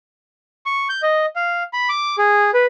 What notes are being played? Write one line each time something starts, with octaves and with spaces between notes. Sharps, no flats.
C#6
G6
D#5
F5
B5
D6
G#4
B4